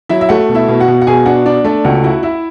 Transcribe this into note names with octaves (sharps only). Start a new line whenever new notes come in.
F#3 E4 E5
E5
A3 F#4 F#5
B2
E4 E5
B2
F#4 F#5
B2
F#5
B2 G#4 G#5
D4 F#4 F#5
D4 D5
A3 D4 D5
C#2 F#4 F#5
E4 F#4 F#5
E4 E5